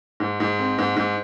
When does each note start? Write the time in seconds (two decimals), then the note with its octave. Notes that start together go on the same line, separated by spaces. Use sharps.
0.20 G#2
0.40 G#2
0.59 C4
0.78 G#2
0.96 G#2